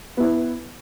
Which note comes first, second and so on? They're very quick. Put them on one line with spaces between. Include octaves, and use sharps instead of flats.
B3 E4 B4